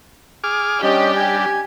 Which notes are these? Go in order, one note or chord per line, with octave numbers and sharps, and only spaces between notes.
G#4 D6 F6
G3 C#4 D4 G4 D#5
G#5